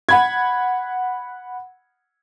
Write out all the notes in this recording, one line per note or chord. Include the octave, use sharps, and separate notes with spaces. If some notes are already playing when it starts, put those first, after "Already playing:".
F#5 B5 G#6